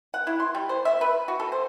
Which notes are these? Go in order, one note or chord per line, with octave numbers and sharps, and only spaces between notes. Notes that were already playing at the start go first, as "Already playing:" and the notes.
F#5
E4
C6
G3
C5
E5
B4
F#4
A4
C5